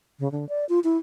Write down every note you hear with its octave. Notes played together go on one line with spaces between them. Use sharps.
C#3
D3
D5
F4
E4